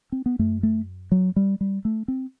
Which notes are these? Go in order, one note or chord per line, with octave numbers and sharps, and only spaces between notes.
C4
B3
F#2 A3
A3
F#3
G3
G3
A3
C4